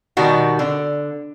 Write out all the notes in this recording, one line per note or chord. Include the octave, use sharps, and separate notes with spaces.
B2 D#3 G3 F#4
D3